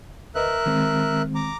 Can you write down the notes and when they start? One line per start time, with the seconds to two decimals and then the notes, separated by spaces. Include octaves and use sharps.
0.35 D2 A#4 B4 D#5 E5 F#6
0.66 D#3 G#3 C4
1.35 A#5 D6